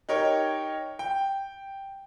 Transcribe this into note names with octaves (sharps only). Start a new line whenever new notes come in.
D#4 G4 A#4 C#5
G5